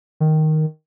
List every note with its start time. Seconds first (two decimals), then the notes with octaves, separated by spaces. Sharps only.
0.20 D#3